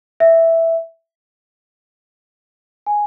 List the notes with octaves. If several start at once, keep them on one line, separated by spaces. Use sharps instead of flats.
E5
G#5